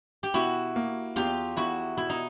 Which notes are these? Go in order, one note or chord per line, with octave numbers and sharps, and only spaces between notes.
G4
B2 E4 F#4
A#3
E2 F4 G4
E2 E4 F#4
B2 E4
D#4